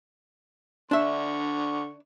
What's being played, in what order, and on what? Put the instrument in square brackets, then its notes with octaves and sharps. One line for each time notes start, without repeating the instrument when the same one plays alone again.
[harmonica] D3 C#6 [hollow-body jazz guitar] D4 E5